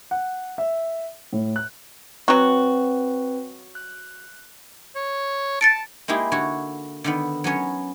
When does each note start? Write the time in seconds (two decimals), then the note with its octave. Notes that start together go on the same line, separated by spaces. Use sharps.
0.11 F#5
0.58 E5
1.33 A2
1.56 F#6
2.28 F#3 C4 F#4 B4
3.75 F#6
4.96 C#5
5.61 A5 A6 C#7 D7
6.08 G#3 A#3 D#4 E4 G4 G#4
6.32 D3 F#4 C#5
7.04 D3 D#3 B3
7.44 F#3 B3 C#4 C#5